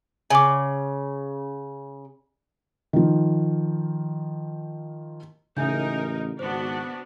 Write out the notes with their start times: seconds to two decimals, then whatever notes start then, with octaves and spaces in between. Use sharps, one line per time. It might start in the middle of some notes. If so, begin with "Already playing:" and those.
0.30 C#3 G#5 D6
2.93 D#3 F3
5.57 A1 C#3 D#4 A#4 E5 G#5 G6
6.39 G#1 B3 D4 F#4 C5